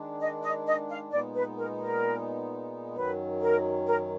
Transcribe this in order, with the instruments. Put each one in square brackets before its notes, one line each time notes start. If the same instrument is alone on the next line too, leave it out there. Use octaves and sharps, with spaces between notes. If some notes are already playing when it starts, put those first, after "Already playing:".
Already playing: [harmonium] D#3 G#3 D4
[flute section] D#5
D#5
D#5
F5
[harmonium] A#2 G#3 B3 D#4 [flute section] D5
[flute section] B4
A#4
A#4
[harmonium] F#2 D#3 F#3 [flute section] B4
[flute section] A#4
A#4